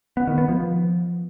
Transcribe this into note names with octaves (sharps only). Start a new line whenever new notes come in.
B3
D#3
B3
F3